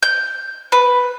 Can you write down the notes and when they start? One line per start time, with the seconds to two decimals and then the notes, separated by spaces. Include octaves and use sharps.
0.03 G6
0.72 B4